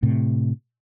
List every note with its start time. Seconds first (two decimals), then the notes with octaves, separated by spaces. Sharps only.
0.03 A2 C3